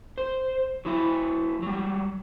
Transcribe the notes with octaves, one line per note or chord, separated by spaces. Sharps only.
C5
F#3 E4 E5
F#3 G3